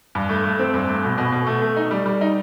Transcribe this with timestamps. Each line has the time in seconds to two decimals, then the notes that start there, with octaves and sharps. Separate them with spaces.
0.15 G2
0.29 A3
0.44 A3
0.59 C4
0.74 G2
0.89 A3
1.03 B2
1.18 B2
1.32 B2
1.47 A3
1.62 A3
1.77 D#4
1.91 G3
2.06 G3
2.21 D#4